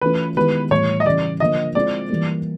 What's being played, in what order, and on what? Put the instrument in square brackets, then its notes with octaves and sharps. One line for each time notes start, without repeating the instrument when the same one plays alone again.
[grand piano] E3 A3 C#4 F4 [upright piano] B4
[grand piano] D#3 G#3 B3 E4 G4 [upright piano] B4
[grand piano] A2 E3 G3 [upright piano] C#5
[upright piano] D#5
[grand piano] C#3 E3 G3 [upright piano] D5
[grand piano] D3 F3 A#3 [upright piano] D#5
[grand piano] G#3 C4 F4 G#4 [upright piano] D5
[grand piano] E3 G3 A#3